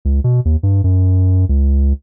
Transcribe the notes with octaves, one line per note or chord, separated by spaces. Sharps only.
C#2
B2
D#2
G2
F#2
C#2